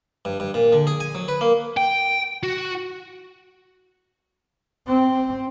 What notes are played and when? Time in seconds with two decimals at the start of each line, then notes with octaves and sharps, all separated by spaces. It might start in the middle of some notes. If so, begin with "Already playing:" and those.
0.25 G2
0.40 G2
0.54 A#2
0.73 D3
0.87 G#4
1.00 G#5
1.15 F#3
1.28 B4
1.41 A#3
1.77 G5
2.43 F#4
4.88 C4